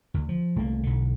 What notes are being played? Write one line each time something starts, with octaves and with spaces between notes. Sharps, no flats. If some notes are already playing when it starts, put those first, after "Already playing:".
D2
F3
C2 A3 A#3
B1 D3